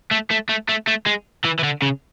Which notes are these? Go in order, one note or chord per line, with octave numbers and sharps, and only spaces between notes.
A3
A3
A3
A3
A3
G#3
E3
E3
D3
C#3